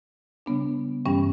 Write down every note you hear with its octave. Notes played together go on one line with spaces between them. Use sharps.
C#3 G3 B3 D4
G2 E3 G3 C#4